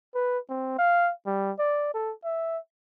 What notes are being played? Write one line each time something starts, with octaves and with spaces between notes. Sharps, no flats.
B4
C4
F5
G3
D5
A4
E5